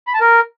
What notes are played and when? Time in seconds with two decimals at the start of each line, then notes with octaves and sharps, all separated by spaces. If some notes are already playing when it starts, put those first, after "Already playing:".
0.07 B5
0.14 A5
0.21 A#4